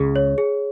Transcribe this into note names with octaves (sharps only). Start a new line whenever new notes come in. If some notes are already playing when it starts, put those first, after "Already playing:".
Already playing: C#2 C#3 G#4
C#5
G#4